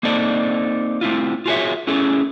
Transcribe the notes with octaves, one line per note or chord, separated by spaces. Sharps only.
A#3 C4 D#4 A4 D5
A3 C4 E4 F4
F4 F#4 G#4 A4 C#5 E5
A3 C#4 E4 G#4 A4